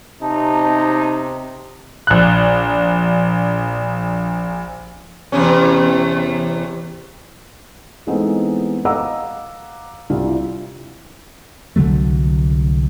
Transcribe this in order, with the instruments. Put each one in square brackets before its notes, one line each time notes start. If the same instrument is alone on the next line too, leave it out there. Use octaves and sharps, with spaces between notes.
[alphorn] C3 [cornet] D#4 [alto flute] A5
[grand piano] A#1 F#6
[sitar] E2 C3 C#4
[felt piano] E3 G#3 A3 B3 C4 D#4
D#5 F5 F#5 A#5 D6 E6
C2 D4 E4 F4 F5
[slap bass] C2 D3 F#3 A3